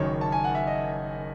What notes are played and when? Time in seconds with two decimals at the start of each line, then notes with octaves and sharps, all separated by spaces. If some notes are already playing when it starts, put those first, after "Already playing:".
Already playing: F#1 F#2 D#3 C#5
0.21 A5
0.32 G#5
0.44 F#5
0.55 E5
0.67 D#5